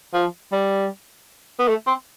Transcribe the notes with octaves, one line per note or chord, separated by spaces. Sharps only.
F3
G3
B3
A3
C4